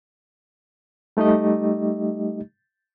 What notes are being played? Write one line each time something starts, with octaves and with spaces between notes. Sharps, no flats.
G3 A3 D#4 G4 D#5